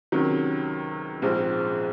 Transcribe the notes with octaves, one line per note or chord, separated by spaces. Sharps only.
C#2 C3 D#3 F#3
A#1 G#2 F3 G#3 C4